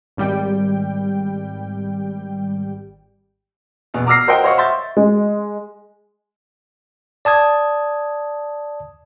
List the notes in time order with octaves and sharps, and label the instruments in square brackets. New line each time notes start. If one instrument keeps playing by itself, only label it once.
[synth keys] G#1 G3 G5
[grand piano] E2 B2
A#5 D6 E6 F6 A#6 C7
F#4 A#4 C5 D#5 F#5 G5
C5 C#5 D#5 F5 F#5 C#6
E5 C6 G6 A6
[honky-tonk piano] G#3
[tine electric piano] D5 A5 D#6 G#6